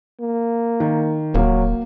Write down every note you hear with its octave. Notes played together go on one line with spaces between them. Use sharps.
A#3
D#3
D#1 F#3 A#3